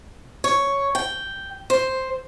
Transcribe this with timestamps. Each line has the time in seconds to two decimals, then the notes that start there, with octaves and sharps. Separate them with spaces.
0.44 C#5
0.95 G5
1.70 C5